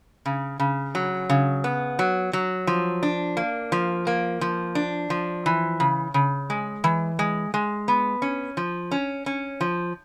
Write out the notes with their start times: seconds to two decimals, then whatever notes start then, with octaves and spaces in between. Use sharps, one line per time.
0.26 C#3
0.59 C#3
0.95 F#3
1.30 C#3
1.64 B3
1.99 F#3
2.33 F#3
2.67 F3
3.03 D4
3.37 A#3
3.72 F3
4.07 A#3
4.41 F3
4.75 D4
5.10 F3
5.46 E3
5.80 C#3
6.14 C#3
6.50 G#3
6.84 E3
7.19 G#3
7.54 G#3
7.88 B3
8.22 C#4
8.57 F3
8.91 C#4
9.26 C#4
9.61 F3